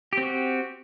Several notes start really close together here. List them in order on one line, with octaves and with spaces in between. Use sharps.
G4 C4 F#4